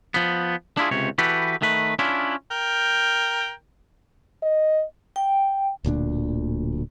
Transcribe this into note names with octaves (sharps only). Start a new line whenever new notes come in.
F3 B3
D4 E4 F4 G#4
C#2 C3 C#5
E3 F#4 G4 A4 B4
D#3 A3 B4
C#4 D4 E4 F4
A#4 G5
D#5
G5
D1 D2 A#2 D4